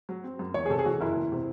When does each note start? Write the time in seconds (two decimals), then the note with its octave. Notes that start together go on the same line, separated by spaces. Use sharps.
0.09 F#3
0.24 C4
0.39 F#2
0.54 E2 C#5
0.66 G#4
0.70 C3 A4
0.79 G#4
0.85 E3 F#4
1.01 F#1 E4
1.17 E2
1.32 C3